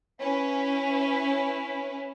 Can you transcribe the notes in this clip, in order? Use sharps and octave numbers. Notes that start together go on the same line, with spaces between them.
C#4 E4 B4